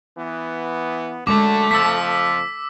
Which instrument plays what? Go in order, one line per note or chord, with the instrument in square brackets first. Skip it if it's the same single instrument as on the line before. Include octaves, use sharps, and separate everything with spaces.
[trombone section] E3 B3
[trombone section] F#2 D3 [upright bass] G#3 C#4 [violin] A3 [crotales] D6
[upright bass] F#1 [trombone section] F2 F3 [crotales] E6 B6